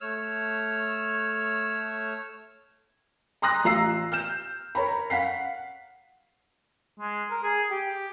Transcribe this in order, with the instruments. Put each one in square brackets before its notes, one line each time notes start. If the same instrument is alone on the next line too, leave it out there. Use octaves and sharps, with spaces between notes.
[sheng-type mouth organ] A3 C#5 E6 F6
[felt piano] A#5 C6 D#6 F#6 A#6
A1 F4 A#5 E6 C7
F6 G6 E7
A#4 C#5 A#5 B5
F5 F#5 B6 C7
[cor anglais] G#3
A#4
G#4
G4